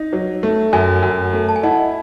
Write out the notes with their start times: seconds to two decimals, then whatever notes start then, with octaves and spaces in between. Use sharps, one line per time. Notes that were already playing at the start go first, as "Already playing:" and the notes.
Already playing: D#4
0.13 F#3
0.43 A3
0.73 F#2 E5 G#5
1.03 F#2
1.33 A3
1.49 A5
1.56 G#5
1.63 E4 D#5 F#5